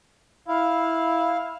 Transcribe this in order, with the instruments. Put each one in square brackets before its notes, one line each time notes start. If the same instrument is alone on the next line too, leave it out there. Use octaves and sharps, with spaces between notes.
[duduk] E4 [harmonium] F5